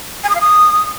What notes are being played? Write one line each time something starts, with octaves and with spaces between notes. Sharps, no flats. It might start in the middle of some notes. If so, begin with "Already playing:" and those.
G#5
D#6
F5
D#6